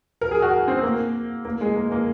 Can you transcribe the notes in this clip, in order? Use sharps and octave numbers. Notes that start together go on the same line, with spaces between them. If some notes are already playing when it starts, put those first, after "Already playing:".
A#4
G#4
F#4
C4
A#3
A#3
G#3
A#3
A#3